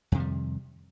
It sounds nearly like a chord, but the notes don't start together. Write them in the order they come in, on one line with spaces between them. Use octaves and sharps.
F2 C3 D#3 G3